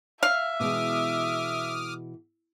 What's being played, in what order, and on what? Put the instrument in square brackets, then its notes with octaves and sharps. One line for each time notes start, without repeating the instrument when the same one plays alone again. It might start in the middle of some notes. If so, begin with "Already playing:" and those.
[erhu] E5 [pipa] F5
[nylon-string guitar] B2 E3 G#3 [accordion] D6 D#6 F6